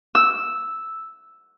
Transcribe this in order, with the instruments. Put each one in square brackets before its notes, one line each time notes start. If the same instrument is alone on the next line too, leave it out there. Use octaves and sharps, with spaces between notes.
[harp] E6